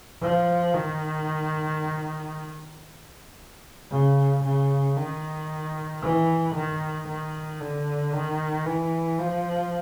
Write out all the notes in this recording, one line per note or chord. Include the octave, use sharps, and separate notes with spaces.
F3
D#3
C#3
C#3
D#3
E3
D#3
D#3
D3
D#3
E3
F3